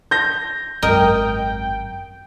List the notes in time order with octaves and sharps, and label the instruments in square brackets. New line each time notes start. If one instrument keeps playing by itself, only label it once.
[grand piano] G6 A#6
[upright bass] G#1 F#2 [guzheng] A#4 D#5 [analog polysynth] G5